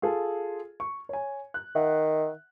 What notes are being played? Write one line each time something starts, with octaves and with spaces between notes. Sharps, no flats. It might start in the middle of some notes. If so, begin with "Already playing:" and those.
F4 G#4 A4
C#6
C#5 G#5
F#6
D#3 E5 F#5